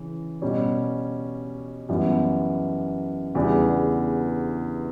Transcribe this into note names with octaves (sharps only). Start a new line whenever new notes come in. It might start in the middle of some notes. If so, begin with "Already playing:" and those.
Already playing: C#3 E3 C#4
B2 G3 C#4
F#2 E3 G3 B3
E2 C#3 G3 B3 D4